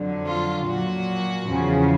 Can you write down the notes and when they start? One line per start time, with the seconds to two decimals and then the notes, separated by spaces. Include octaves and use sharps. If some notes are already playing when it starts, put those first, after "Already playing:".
Already playing: F2 D3 F#3
0.28 F4
0.67 A#2 F#3 F#4
1.46 E2 C#3 F3